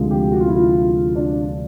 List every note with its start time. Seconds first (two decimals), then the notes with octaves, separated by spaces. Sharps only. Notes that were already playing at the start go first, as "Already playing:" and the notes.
Already playing: D2 C3 F3 G#3
0.11 G4
0.32 F#4
0.40 F4
0.48 E4
0.56 F4
1.16 D4